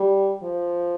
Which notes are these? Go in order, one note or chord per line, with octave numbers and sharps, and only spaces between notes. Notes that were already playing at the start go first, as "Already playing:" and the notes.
Already playing: G3
F3